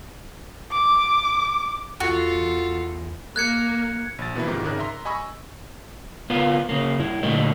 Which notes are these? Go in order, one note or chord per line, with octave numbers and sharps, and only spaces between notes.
D6
E2 F4 F#4 A4
A#3 F#6 G#6 C#7
A#1 A6
B2 E3 A#3 E4
G#2 C3 D#3 F3
G#1 C#3 D#4 A#4 F#6
E5 A#5 C6
D#5 G#5 B5 C#6 E6
B3 F4 A#4
C#3 A#3
G2 E4
A#2 D3 A3 A#4 D#5